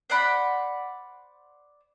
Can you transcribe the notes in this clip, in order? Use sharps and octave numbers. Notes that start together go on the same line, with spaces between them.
C5 D5 F#5 B5